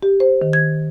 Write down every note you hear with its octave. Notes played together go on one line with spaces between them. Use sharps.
G4
C5
D#3
G#6